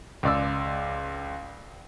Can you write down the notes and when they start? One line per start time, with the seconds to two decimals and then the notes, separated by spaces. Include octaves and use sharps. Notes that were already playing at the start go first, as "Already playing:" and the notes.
0.23 C#2 D5 E6